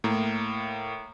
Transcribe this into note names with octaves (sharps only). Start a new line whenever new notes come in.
A2 A#3 A#5